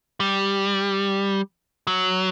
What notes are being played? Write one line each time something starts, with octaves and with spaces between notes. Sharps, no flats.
G3
F#3